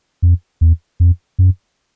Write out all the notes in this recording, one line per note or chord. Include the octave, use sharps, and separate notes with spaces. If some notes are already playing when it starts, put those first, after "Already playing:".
F2
E2
F2
F#2